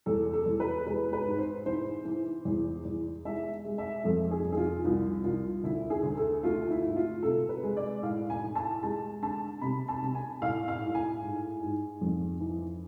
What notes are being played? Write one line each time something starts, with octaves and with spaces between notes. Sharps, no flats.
E2 A4
A4
E2
B4
G#3 B4
B4
G#2
C5
E3 C5
E3
E2
E2
G#3 E5
G#3
E5
F2 A4
G#4
F2
G#4
F4
C2 F4
C2 F4
D2 E4
G#4
D2
A4
A3 F4
E4
G#2
F4
C3 A4
B4
G#3
D5
A2 F5
G#5
E3
A5
G#3 A5
D3 A5
C3 B5
A5
C3
G#5
A2 F5
F5
A2
G#5
G#2
G#2
F2
E3